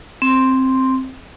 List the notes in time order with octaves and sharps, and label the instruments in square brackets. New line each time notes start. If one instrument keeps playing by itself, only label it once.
[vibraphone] C4 C6